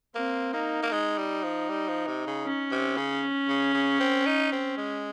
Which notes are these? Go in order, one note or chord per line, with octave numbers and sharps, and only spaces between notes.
A#3 C4
A#3 D#4
A#3
G#3 D#4
G3
F3
G3
F3
C3
C#3
C#4
C3
C#3
C#3
C#3
C4
D#4
C4
G#3